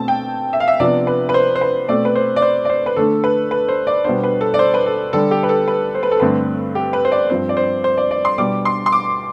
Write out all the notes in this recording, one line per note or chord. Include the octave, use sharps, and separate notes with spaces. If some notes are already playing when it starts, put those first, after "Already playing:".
Already playing: B2 A3 C4 A5
G5
E5
F5
E5
C3 F3 B3 D4 D5
B4
B4
C5
C5
B4
B2 A3 C4 D5
B4
C5
D5
C5
D5
C5
B4
D3 A3 D4 A4
B4
B4
C5
D5
B2 G3 B3 D4 C5
B4
A4
D5
C5
B4
A4
D3 G3 D4 A4
G4
B4
A4
B4
C5
B4
A4
G2 D3 A3 C4 B4
G4
B4
C5
D5
G2 F3 C4 C5
D5
C5
C5
D5
D5
C6
B2 G3 D4 D6
C6
C6
D6